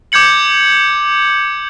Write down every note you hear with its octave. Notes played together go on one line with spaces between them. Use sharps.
D6 G6 G#6 C#7 F#7